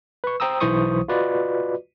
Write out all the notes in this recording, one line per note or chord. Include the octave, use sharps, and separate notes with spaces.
B4 C#6
C5 G5 A#5 D#6 E6
B1 E3 E4 C5 C#6 D#6
F4 F#4 B4 D5 D#5